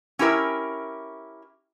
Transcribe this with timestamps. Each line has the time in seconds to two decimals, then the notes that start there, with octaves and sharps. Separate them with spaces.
0.19 C#4 E4 G4 A#4 E5